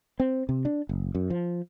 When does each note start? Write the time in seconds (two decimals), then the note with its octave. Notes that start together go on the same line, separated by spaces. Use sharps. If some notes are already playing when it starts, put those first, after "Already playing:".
0.20 C4
0.49 C3
0.65 D4
0.89 F#1
1.15 F#2
1.30 F3